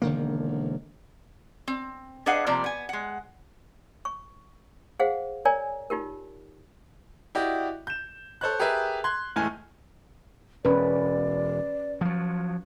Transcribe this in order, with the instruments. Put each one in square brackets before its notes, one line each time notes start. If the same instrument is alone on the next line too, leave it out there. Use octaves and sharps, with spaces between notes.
[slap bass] E1 D3 D#3 A#3
[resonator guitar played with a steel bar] C4
D4 G#4 B4 D#5 F5 F#5
C3 F3 G3 A#3 D5
B3 G#5
G#3 F#5
[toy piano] C#6
G#4 C5 F5 F#5
A#4 C#5 D5 G#5 A#5
D#4 F4 G4 A#4
[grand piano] E4 F#4 G4 D5 D#5
G6 E7
A4 C5 C#5 F#6
G4 G#4 A#4 B4 E5
C6 F#6 G#6
E2 A2 G#3 A3 G#5 F6
[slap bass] E1 [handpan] C#4 B4 [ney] D5
[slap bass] F3 F#3